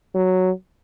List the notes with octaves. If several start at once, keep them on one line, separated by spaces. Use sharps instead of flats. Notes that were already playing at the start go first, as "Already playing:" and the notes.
F#3